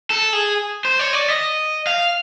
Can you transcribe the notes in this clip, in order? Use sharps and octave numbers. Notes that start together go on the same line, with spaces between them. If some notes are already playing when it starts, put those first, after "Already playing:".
A4
G#4
C5
C#5
D5
D#5
F5